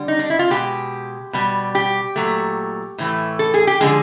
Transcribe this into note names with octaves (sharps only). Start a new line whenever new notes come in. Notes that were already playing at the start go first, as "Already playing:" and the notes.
Already playing: D3 G3
D#4
D4
E4
F4
B2 G#3 G4
B2 G3
G4
A#2 F#3 A3
A2 E3 A3
A4
G#4
G4
D3 F3 G#3 G#4